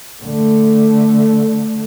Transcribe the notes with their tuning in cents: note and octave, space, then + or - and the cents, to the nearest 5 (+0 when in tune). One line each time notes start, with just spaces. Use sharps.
D3 +0 A3 +0